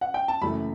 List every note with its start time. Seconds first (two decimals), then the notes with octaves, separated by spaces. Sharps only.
0.01 F#5
0.14 G5
0.28 A5
0.41 F#1 F#2 E3 A3 B5